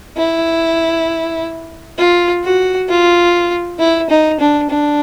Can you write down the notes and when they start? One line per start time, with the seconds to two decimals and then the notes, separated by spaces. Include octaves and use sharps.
0.17 E4
1.98 F4
2.44 F#4
2.89 F4
3.79 E4
4.10 D#4
4.40 D4
4.70 D4